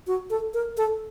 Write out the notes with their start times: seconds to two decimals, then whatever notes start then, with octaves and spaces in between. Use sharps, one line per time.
0.07 F#4
0.30 A4
0.54 A#4
0.77 A4